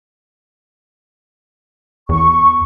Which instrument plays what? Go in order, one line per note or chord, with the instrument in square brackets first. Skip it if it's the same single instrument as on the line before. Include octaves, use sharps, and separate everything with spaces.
[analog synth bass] E2 [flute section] C#6